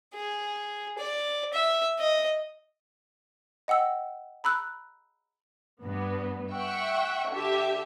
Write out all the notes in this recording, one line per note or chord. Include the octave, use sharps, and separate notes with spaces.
G#4
D5
E5
D#5
D#5 F#5 G5 E6
A#5 B5 E6 F#6
G2 B3
E5 F#5 G5 C#6
D3 G4 E5